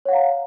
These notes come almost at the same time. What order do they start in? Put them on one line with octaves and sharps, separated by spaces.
C#5 F#5 F5 A#5